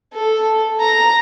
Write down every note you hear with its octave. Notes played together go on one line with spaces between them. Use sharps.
A4
A#5